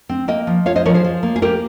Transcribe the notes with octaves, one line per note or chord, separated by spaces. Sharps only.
C4
A#3 D#5 G5
F3
F4 C#5 F5
C5 D#5
F3 A#4 C#5
G#4 C5
F3
A#3
G#4
A#3 G4 A#4